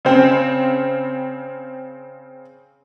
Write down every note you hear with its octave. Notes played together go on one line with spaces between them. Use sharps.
C#3 C4